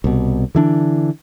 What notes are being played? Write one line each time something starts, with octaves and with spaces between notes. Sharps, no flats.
C2 B2
D3 E3 D4